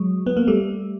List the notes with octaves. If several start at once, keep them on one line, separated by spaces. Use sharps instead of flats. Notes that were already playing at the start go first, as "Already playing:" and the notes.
Already playing: F#3 G#3
B3
A#3
G3 A3